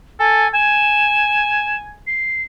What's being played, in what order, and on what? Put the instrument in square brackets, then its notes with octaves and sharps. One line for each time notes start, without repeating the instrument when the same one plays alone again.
[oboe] A4 [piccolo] G#5
[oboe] G#5 [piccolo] E7
[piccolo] C7